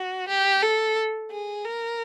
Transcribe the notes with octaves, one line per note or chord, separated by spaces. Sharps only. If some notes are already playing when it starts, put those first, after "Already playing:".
Already playing: F#4
G4
A4
G#4
A#4